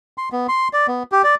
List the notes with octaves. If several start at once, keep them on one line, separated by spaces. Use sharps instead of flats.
C6
B3
C6
D5
B3
G4
D5